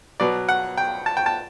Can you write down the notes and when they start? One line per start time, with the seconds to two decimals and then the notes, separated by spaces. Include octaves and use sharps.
0.20 B2 F#3 B3 D5
0.49 F#5
0.78 G5
1.06 A5
1.17 G5
1.26 A5